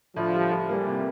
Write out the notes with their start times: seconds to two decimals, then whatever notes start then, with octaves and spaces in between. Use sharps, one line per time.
0.16 A2 D3 F3
0.33 G3
0.52 A2
0.69 E3 G3 A#3
0.87 C3